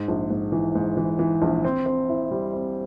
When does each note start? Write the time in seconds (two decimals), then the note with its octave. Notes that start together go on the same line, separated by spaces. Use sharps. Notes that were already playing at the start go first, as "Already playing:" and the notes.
Already playing: G#2
0.08 A#1
0.30 G#2
0.52 E3
0.75 G#2
0.97 E3
1.19 E3
1.42 A#1
1.65 C4
1.86 C4
2.09 E4
2.31 G3
2.53 C4